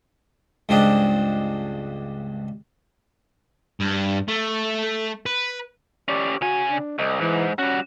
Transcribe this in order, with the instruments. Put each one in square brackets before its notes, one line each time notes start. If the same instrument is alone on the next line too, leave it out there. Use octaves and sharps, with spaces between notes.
[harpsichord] C#2 G2 C4 D4 D#5
[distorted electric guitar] G2
A3
B4
[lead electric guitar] C#4 G4 [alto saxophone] D5
[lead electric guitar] C#3 G#5 [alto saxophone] F#4
[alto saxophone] D4
[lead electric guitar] C2 [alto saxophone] D#5
[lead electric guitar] G#2 [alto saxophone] E3
[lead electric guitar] G3 F#4 [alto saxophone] C#4